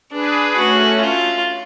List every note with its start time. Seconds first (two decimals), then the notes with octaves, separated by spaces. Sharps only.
0.12 D4 G#4 B4
0.56 A3 C#4 F#4
1.00 F4